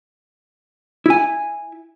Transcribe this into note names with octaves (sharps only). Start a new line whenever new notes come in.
E4 G#5